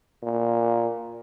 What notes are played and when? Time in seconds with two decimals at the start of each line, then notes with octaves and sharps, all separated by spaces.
0.23 A#2